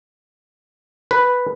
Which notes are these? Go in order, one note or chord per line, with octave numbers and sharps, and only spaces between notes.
B4